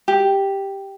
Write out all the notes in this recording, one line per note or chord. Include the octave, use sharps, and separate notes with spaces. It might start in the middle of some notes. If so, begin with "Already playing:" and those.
G4